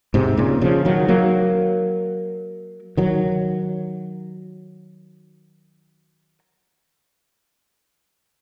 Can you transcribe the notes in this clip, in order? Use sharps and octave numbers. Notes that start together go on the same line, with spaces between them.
G#2 C3
A#2 C#3
C#3 F3
D#3 F#3
F#3 A#3
D#3 F#3